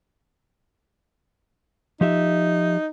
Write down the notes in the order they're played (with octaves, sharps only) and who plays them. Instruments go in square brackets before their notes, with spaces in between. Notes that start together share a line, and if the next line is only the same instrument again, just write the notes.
[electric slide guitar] F3 G4 E5 [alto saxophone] D#4